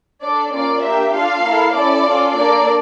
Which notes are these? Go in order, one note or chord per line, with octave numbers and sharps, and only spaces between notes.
D4 A4 D5
A#3 C#4 F4 D5
A#3 D4 G4 E5
D4 F4 A4 F5
A#3 E4 A4
C#4 E4 A4 D5
C#4 F4 A4
A#3 D4 A4 D5